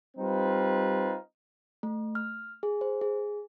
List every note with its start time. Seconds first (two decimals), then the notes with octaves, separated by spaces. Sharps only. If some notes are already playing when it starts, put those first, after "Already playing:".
0.17 G3 C4 D#4 F4 B4
1.83 A3
2.15 F6
2.63 G#4
2.81 C5
3.01 G#4